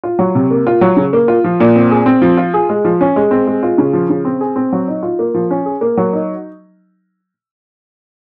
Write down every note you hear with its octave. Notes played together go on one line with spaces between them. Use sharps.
F4
F#3
C3
A#3
F4
F#3
C#3
A#3
F4
F3
A#2
C4
G#4
C4
F3
F4
G#4
G#3
F3
C#4
G#3
C4
G#3
F4
C#3
F3
C#3
C4
G#4
C4
F#3
D#4
F4
A#3
F3
C#4
G#4
A#3
F#3
D#4